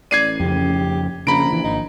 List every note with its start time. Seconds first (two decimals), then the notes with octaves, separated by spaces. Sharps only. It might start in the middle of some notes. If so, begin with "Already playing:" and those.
0.11 A1 D5 G#6 C7 D#7
0.40 F2 C#3 G4
1.27 A#1 C#3 A#5 B5 D7
1.53 E3
1.64 G#1 D#4